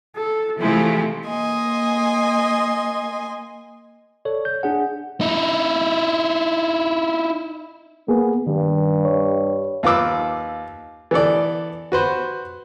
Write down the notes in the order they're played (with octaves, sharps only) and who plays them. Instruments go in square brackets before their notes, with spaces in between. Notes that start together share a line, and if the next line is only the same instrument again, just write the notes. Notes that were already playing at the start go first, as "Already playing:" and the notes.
[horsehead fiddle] A4
[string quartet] C3 F3 G#3 [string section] E3 E4 [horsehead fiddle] A3
[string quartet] A#3 D#5 G#5 C6
[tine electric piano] A4 C#5 D5
G6
D4 G#4 F#5
[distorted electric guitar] D#4 E4
[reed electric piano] A#3 G#4 [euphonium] B3
[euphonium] G2 [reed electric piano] D#3 G3
[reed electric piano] C#5
[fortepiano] D#2 F4 B4 D6 E6
E3 B3 A4 D5
F#4 B4 C5